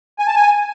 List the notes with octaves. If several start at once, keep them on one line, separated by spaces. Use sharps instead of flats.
G#5
A5
G#5